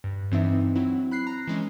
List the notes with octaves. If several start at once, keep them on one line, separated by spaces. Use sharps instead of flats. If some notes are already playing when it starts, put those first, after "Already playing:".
G2
G2 E3 C4 D4 D#4 E5
F#3 C4 E4
B5 F#6 C7
A#5
E3 G#3 C#4